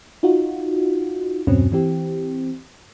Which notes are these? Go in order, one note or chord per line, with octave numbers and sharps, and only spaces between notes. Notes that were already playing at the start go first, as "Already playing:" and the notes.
D#4 F4 F#4
E2 G2 B2 F#3 C4 C#4
E3 C4 G4